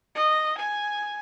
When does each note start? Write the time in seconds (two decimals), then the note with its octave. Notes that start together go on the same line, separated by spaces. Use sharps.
0.15 D#5
0.58 G#5